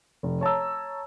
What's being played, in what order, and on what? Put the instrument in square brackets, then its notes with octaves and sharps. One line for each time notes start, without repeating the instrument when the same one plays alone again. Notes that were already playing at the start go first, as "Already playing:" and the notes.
[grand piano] F1
C#5 A5 A#5 E6